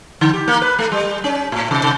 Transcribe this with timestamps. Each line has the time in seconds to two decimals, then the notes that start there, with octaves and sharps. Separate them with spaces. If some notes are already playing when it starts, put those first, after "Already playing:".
0.21 D3
0.33 G4
0.48 A#3
0.62 B4
0.79 A3
0.92 G3
1.24 C#4
1.52 A2
1.71 C3
1.84 C3